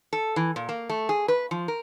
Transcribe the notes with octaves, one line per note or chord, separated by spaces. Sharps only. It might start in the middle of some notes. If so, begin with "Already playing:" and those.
A4
E3
A#2
A#3
A3
G#4
B4
F3
A#4